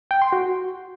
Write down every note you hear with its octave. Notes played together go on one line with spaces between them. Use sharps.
G5
C6
F#4